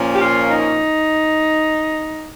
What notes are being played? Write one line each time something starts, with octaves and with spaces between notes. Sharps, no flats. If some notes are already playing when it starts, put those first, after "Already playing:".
Already playing: A#2 F3 A#3 C#4
G4
F4
D#4